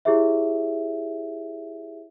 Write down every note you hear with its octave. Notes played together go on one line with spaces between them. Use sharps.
E4 G4 G#4 C#5 E5